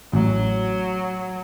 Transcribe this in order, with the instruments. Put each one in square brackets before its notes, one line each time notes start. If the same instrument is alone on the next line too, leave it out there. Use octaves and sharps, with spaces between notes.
[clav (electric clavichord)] A1 [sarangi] F#3